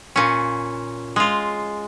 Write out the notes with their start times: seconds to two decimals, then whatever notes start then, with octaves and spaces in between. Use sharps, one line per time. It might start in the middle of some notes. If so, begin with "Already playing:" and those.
0.16 A#2 C#4
1.16 G#3 F4